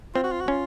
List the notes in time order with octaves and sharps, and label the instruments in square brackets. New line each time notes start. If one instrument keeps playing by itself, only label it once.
[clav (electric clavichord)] C4 [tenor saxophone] F4
[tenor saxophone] F#4
F4
F#4
[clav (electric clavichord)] C#4 [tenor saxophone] F4